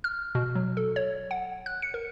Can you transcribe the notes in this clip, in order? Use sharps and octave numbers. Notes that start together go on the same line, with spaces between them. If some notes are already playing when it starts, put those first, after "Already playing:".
F6
B2
F#3
A4
C#5
F#5
F#6
C#7
A#4